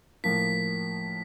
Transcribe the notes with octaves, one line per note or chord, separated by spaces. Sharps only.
A2 F3 A#3 B6